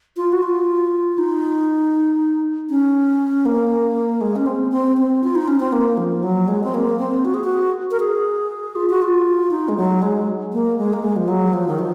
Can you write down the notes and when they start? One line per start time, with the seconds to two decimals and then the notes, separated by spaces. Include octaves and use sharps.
0.17 F4
0.32 F#4
0.43 F4
1.18 D#4
2.70 C#4
3.46 A#3
4.21 G#3
4.36 C#4
4.46 C4
4.72 C4
4.97 C4
5.24 F4
5.35 D#4
5.48 C#4
5.60 C4
5.73 A#3
5.97 F3
6.23 F#3
6.48 G#3
6.64 C4
6.74 A#3
6.99 C4
7.25 F#4
7.34 G#4
7.44 F#4
7.91 A#4
8.00 G#4
8.76 F4
8.90 F#4
9.02 F4
9.51 D#4
9.69 G#3
9.77 F#3
10.02 G#3
10.53 A#3
10.78 G#3
10.93 A#3
11.03 G#3
11.17 F3
11.28 F#3
11.53 F3
11.68 D#3
11.79 F3